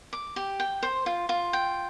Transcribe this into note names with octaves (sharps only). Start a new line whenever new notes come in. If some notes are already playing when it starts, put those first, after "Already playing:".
D6
G4
G5
C5
F4
F4
G5